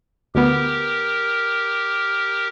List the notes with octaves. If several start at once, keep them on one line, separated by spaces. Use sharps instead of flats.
D2 B3 G4 A#4